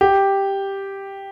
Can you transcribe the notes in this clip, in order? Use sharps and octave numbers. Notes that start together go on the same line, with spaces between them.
G4